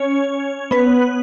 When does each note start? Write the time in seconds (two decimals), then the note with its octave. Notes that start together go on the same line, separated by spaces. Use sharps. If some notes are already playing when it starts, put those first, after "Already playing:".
Already playing: C#4 C#5
0.71 B3 B4